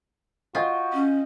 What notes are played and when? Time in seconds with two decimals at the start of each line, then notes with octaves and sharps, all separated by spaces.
0.55 F4 F#4 D#5 G5
0.93 C#4